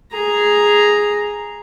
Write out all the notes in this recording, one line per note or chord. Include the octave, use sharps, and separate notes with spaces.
G#4 A#5